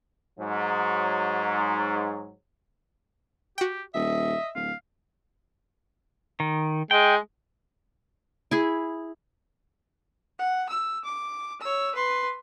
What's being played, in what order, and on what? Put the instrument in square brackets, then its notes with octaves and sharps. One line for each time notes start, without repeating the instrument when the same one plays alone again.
[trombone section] G#2 F#3
[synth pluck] F#4 G5 [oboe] G4
[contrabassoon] D#1 [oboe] D#5 [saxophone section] E5
[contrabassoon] D1 [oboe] F5
[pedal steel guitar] D#3
[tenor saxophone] G#3 [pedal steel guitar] G5
[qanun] E4 G#4
[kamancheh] F#5
E6
D6
C#5 E6
B4 C6